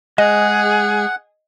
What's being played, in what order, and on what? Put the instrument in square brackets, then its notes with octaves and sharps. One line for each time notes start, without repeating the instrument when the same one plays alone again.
[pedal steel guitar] G#3 [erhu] G#4 [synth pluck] D#5 [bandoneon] F#5